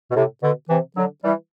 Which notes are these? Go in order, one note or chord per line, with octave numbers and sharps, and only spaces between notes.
B2
A2 C3
B2 D3
C3 E3
D3 F#3
E3 G3